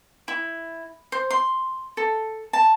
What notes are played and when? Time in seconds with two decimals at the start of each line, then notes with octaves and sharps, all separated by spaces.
0.28 E4
1.12 C5
1.30 C6
1.97 A4
2.53 A5